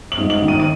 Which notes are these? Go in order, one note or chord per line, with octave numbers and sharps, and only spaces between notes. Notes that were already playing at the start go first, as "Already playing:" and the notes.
F#7
G#2
F#7
D#3
D#7
D#7